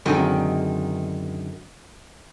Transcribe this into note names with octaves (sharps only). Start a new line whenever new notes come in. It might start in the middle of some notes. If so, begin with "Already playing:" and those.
F#2 D3 D#3 G#3 C4